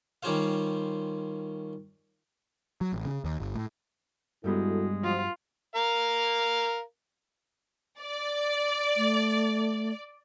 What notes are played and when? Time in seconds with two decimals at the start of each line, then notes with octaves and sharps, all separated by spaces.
0.23 D#3 G3 C#4 F4 C5 F5
2.81 F#3
2.93 A1
3.05 C#3
3.24 D#2
3.40 G1
3.55 A2
4.44 G2 G3 G#3 B3 E4 F#4 A4
5.03 F3 F#3 F4 F#4
5.76 A#4 F5
8.01 D5
8.97 A3